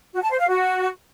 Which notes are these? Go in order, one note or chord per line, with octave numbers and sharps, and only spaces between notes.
F#4
A5
C5
F5
F#4